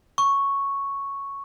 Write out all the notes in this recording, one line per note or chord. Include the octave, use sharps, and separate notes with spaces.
C#6